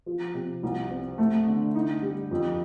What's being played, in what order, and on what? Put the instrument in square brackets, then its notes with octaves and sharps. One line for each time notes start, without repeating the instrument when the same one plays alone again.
[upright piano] F3
C3
C2
C4
A3
D3
D#4
G3
F2